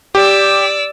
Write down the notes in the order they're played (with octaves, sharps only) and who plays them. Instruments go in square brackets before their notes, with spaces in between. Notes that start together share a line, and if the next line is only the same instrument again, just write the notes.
[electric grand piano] G4 [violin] D5 E6